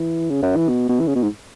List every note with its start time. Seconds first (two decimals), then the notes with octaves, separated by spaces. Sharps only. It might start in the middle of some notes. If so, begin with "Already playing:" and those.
Already playing: E3
0.30 C#3
0.43 F#2
0.56 E3
0.69 B2
0.89 B2
1.00 E3
1.08 C#3
1.15 B2
1.23 G#2